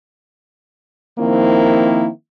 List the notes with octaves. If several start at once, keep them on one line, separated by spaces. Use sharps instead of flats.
D#3 F3 A#3 C4 E4